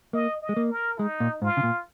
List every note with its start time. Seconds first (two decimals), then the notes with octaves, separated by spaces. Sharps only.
0.13 A#3 D#5
0.42 D#5
0.49 G#3
0.57 A#3
0.70 A#4
0.99 G#3 D#4
1.20 A#2
1.42 G#2 F4
1.57 C#3
1.63 A#2